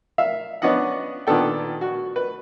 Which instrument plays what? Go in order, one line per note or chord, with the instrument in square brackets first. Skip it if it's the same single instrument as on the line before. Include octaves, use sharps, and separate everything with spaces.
[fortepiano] E5 F5
B3 C#4 D4 D#5 F#5
A#2 D#3 B3 D4 A4 G5
F#4
B4